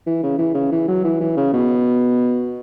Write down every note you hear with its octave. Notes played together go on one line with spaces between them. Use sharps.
E3
C#3
E3
C#3
E3
F#3
E3
E3
C#3
B2